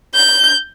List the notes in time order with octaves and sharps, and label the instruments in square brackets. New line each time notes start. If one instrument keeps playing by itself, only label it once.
[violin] G6